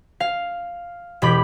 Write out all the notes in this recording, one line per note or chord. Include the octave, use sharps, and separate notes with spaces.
F5
E1 G4 B5